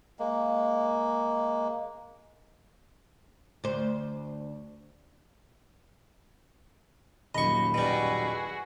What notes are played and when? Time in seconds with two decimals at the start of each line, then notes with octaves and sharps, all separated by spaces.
0.19 G#3 A#3
3.64 D2 C5
7.35 D#1 F#2 A#3 D#5 B5 C#6
7.74 B2 G3 E4 F#4 G#4